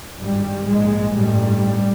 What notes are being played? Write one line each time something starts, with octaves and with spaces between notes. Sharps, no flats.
G#1 G2 G3
A#1 G#2 G#3
A1 G2 G3